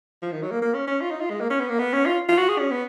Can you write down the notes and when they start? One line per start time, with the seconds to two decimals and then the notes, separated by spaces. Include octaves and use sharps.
0.22 F3
0.32 D#3
0.42 F#3
0.51 A#3
0.62 A#3
0.74 C#4
0.87 C#4
1.01 F4
1.11 D#4
1.21 F4
1.30 G#3
1.41 A#3
1.50 C#4
1.60 B3
1.69 A#3
1.79 B3
1.93 C#4
2.06 F4
2.29 F4
2.38 F#4
2.49 G#4
2.59 C#4
2.71 B3